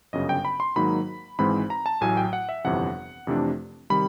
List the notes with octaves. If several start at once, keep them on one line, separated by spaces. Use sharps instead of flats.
G1 F#2 C#3 D#5
G5
B5
C6
G#2 D#3 F#3 A#3 D#4 B5
G#1 G#2 E3 G#3 C4 B5
A#5
A5
A1 A2 F#3 G#5
G5
F#5
E5
G1 F2 C3 E3 F#5
F2 C3 E3 A3 D4
C3 D#3 G3 B5